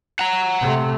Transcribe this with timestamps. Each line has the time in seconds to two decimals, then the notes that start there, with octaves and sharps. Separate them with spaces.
0.19 F#5 A#5
0.61 C3 A3